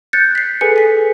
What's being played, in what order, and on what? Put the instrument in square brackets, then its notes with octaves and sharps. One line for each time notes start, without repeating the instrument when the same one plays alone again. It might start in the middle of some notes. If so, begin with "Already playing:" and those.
[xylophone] F#6 G6 A6 C#7
B6 C7
G#4 A4 B4 G#5 C#7
G#5 B6